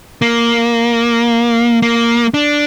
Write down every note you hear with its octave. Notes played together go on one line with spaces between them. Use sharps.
A#3
A#3
D4